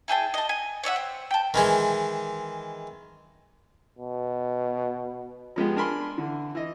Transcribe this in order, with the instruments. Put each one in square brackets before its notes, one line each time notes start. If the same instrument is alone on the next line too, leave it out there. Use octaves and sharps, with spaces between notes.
[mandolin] E4 G#4 G5 A5
D#5 A5
G#5
C#5 D5 E5 F#5
C4
G5 A5
[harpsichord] D#3 E3 G#3
[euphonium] B2
[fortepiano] F3 G#3 B3 G4
D4 A#4 G#5 B5 C6
D3 E3
E3 D#5